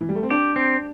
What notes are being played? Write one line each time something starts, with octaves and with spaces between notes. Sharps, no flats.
E3
G3
A3
C4
D4 G4
C4